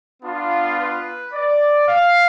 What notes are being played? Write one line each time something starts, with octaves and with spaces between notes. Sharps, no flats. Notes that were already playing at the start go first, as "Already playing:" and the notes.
B3 D4 F4
B4
D5
F5